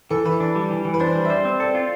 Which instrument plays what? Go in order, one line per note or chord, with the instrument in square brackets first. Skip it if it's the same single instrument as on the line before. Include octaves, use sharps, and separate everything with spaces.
[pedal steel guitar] E3 [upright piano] A4
[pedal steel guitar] E3 [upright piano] B4
[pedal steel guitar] D4
G3
E3
E3
[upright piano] B4
[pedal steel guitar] D4 [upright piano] C5
[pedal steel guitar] G3
[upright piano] E5
[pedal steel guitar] C5 [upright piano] D5
[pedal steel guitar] C4
[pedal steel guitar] A4 [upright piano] D5
[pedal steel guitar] F4